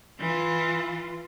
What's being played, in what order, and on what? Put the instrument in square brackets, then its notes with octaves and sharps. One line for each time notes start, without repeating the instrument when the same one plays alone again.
[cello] E3 F4